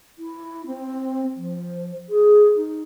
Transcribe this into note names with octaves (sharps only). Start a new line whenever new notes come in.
E4
C4
F3
G#4
D#4